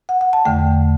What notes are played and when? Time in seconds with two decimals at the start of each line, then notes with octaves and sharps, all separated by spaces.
0.09 F#5
0.21 F#5
0.33 A5
0.45 E2 D3 A3 G5